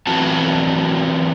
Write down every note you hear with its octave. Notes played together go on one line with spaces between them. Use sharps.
E3 F#3 C4 F#4 A5